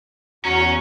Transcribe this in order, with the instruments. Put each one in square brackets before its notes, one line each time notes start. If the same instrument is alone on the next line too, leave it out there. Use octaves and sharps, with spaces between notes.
[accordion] E2 F#4 A#5 [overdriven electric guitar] C#4